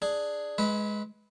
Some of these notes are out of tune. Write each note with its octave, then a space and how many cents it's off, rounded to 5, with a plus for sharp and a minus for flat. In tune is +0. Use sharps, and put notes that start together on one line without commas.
D4 +5 G#4 +0
G#3 +10 B4 +0 E5 -40